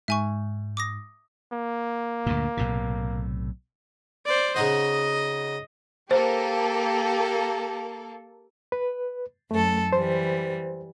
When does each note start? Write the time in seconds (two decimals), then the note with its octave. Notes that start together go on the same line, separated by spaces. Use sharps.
0.08 G#2 E5 G#5 C#6
0.77 D6 D#6 A#6
1.53 A#3
2.26 D2 G2 A#2
2.57 B1 A2 C3
4.25 C5 D5
4.56 C#3 D#4 F#4 D#5
6.11 A#3 G4 A4 C5
8.72 B4
9.51 F#2 A3 A4
9.93 E3 G3 C5